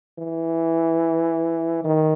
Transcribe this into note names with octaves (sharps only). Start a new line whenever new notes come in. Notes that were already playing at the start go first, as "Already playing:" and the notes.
E3
D#3